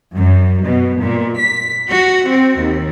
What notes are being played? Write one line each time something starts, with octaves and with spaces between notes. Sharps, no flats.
F#2
B2
A#2
B6
F#4
C4
D#2